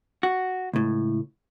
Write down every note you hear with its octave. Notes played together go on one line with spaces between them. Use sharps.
F#4
C#2 A2